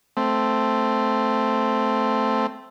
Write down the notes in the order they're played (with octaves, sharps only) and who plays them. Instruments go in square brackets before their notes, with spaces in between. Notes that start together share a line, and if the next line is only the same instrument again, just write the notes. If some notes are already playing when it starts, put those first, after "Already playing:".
[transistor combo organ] A3 C4